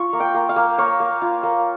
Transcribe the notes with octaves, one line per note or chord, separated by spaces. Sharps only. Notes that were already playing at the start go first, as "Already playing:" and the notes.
Already playing: F4 C#6
A#3
G5
A#3
F5
A#3
A#3 C#5
A#3
F4
A#3